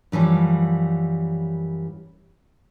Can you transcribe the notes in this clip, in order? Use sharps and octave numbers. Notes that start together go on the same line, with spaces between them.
F#2 E3 F3 G3